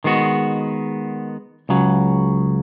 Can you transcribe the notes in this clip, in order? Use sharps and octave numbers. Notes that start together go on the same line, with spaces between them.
D#3 G#3 B3 F#4
C#2 C#3 F#3